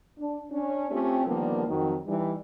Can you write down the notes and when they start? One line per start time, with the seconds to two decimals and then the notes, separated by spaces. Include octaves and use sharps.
0.18 D4
0.51 C#4 D4
0.90 A3 C4 C#4 F4 G4
1.26 D3 D#3 F3 G3 A#3 B3
1.67 F2 D#3 F#3
2.06 E3 G3 D#4